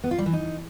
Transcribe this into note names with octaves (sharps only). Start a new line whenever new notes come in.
B3
F4
G3
E3
D#4